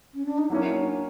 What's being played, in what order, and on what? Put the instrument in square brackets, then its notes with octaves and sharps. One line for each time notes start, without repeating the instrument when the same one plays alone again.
[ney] C#4
D4
D#4
[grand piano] F#3 A#3 C#4 [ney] E4
[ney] D#4
D4